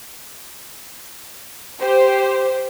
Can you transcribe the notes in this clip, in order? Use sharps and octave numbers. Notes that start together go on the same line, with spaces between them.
G4 C5